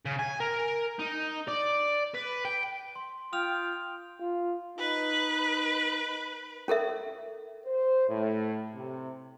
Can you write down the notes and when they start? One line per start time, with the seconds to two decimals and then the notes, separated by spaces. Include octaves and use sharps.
0.06 C#3
0.19 G#5
0.40 A#4
0.99 D#4
1.48 D5
2.15 B4
2.45 G5
2.96 C6
3.33 F4 G5 D#6 F6 F7
4.20 F4
4.78 D#4 B4
6.68 C#4 A4 A#4 E5
7.65 C5
8.08 A2
8.75 C3